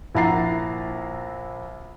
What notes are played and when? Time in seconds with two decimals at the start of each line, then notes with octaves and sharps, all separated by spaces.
0.15 A#1 E4 F#5 A#5 A6 C7